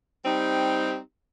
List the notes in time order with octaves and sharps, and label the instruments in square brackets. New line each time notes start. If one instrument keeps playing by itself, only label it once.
[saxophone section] G3 C4 D#4 G4